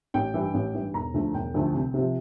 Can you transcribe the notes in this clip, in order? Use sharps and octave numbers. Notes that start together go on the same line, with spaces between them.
A1 G5
G2 E3
A1
G2 E3
E1 A#5
D2 D3 F3 A3
E1 G5
D2 D3 F3 A3
C2
C3 F3